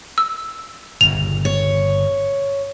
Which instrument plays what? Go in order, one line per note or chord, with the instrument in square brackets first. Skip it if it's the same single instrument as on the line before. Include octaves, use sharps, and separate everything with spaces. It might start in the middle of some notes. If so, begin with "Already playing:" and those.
[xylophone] E6
[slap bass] G1 A#2 C#3 [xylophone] F7
[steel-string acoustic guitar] C#5